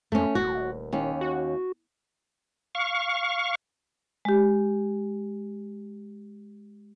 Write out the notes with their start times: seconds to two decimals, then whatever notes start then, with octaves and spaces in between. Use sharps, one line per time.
0.12 F2 A3 C#4
0.35 D#1 F#4
0.93 D#2 C#4
1.21 F#4
2.75 F5 C#6
4.25 G#3 G4